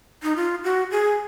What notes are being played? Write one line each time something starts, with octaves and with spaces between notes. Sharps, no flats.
D#4
F4
F#4
G#4